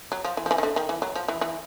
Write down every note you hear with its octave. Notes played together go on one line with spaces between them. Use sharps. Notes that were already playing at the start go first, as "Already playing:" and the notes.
F#3
F3
E3
F3
E3
D#3
D3
D#3
E3
F#3
F3
E3
E3